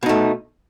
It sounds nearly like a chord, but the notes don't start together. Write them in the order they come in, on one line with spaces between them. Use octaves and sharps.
B2 D#4 A3